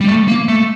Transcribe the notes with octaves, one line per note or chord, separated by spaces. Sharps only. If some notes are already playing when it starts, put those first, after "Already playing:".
G3
A3
A#3
A3